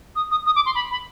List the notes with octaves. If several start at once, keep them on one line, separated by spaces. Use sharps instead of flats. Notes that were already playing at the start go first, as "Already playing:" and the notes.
D#6
D#6
D#6
D6
C6
B5
B5